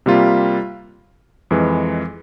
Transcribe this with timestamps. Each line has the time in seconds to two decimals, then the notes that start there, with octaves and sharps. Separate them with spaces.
0.06 C3 G3 A#3 F4
1.51 F2 E3 G#3